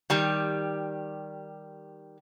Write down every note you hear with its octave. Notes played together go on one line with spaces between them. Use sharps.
D#3 G3 G4